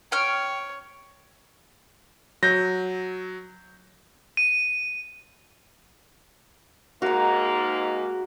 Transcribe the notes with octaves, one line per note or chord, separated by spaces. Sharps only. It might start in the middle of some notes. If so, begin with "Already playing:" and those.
C#5 G5 F6
F#3 G6 A#6
D#7
G#2 A#3 F#4 A#5